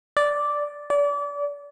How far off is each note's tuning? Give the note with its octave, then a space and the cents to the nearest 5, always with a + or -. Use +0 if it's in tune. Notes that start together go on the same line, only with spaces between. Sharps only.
D5 -5
D5 -30